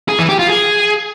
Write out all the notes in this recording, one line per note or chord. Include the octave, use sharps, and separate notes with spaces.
G#4
E3
G4
F4
G#4